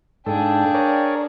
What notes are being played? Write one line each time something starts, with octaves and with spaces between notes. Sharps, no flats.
G#2 D4 G#4 A4 F5 G5
A#4 C#5 D5